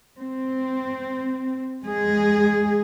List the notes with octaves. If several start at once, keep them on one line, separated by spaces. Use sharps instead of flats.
C4
G#3 G#4